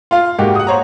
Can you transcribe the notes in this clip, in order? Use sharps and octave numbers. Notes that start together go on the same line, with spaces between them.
F4 F5
G#2 A#3 F#4 G4
F#5 D#6
C5 C#5 A#5